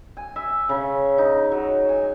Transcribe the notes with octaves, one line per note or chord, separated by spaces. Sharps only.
G#5
E5
C#3
D#4
F#3
G#5